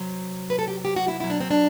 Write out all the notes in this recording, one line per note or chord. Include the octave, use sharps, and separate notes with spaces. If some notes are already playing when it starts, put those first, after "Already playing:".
Already playing: C3 F#3 C5
B4
A4
G4
G4
F#4
E4
B2 F#3 E4
D4
C4
D4